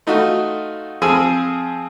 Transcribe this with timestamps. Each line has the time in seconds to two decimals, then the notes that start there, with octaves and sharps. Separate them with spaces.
0.07 A3 D#4 F4 F#4
1.02 F3 C4 G#4 G#5 E6